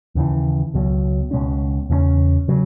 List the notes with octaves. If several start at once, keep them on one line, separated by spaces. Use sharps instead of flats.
D#2 C#3 E3
C#2 B2 F#3
C#2 B2 G#3 C#4
E2 C#3 F#3 C#4
C#3 F#3